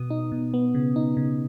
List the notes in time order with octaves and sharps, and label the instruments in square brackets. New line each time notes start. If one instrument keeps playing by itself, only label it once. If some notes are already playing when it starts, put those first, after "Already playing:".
Already playing: [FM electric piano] B2 B3 D#6
D#4
B2
B3
C#3
D#4
C#3